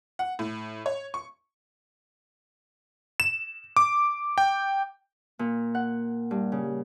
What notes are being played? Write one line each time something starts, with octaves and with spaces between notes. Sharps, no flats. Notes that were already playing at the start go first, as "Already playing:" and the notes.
F#5
A2
C#5
C#6
E7
D6
G5
A#2
F#5
G2
C#3